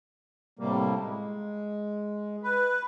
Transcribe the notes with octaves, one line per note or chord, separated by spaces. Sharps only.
A2 C3 G3 A#3
G#3
B4